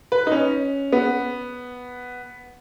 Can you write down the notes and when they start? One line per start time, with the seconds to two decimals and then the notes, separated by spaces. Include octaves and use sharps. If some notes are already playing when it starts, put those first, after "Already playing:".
0.12 B4
0.27 D#4
0.32 C#4
0.92 B3